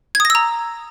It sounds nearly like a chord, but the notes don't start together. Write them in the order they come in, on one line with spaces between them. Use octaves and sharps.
G#6 D#6 A#6 E6 A#5